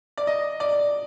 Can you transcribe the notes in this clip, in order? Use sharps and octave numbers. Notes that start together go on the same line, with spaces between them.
D5
D#5
D5